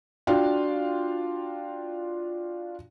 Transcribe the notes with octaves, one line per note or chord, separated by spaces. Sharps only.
D4 F4 F#4 F5 G5